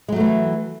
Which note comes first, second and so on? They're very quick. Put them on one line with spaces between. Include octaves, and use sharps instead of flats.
G#3 F#3 A3 E3